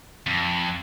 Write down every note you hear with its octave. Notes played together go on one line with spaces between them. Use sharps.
F2